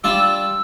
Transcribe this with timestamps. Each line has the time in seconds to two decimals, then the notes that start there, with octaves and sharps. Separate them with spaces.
0.04 G3 D4 F4 E6
0.29 E6